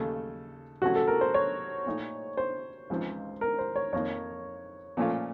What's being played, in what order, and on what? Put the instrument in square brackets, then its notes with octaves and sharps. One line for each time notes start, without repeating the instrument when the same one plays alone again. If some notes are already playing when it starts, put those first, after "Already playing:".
Already playing: [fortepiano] D#2 C#3 A3 [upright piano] A4
[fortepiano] C3 F#3 A3 C#4 [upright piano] F#4
[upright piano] A4
A#4
C5
C#5
[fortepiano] A#2 A3 D#4
[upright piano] C5
[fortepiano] C#2 C#3 F3 C4 D#4
[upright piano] A#4
C5
C#5
[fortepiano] F2 D#3 A#3 [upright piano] C#5
[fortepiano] A#2 F3 A3 C#4 F4